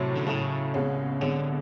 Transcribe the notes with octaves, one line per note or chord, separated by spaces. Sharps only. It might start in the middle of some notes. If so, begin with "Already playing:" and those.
Already playing: A2 C3 F#3 A3
D3
A2 C#3 F#3 A3
C2 B2 G#3 C#4
C2 B2 D3 G#3 C#4